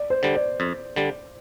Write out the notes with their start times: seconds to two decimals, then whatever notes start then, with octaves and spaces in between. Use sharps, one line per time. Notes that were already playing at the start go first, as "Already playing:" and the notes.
Already playing: D5
0.10 C5
0.23 D3 G3
0.35 D5
0.60 F2
0.96 D3 G3